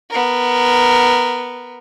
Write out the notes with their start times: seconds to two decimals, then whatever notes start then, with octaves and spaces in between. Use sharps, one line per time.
0.10 B3 A#4